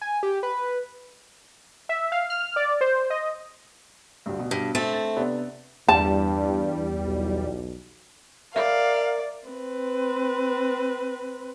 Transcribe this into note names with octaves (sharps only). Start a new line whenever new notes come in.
G#5
G4
B4
E5
F5
F6
D5
C5
D#5
D2 G2
B2
G2
A3 C4 A6
A6
C3 B3 D4
E2 G2 G3 A5
B1
A#4 D5 E5 F5
C4 B4